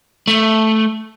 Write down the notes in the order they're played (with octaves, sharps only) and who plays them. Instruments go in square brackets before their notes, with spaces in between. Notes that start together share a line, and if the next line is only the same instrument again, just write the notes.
[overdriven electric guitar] A3